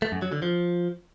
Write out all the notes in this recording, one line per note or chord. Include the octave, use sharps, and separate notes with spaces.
A3
F#2
F#3
D3
F3